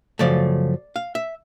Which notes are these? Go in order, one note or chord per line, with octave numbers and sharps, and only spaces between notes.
F#2 C#3 F3 A3 D5
F5
E5